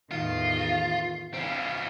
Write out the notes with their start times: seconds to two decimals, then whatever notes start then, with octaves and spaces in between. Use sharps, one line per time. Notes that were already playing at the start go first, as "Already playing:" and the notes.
0.11 E2 A2 D#3 F4
1.34 E3 C4 F5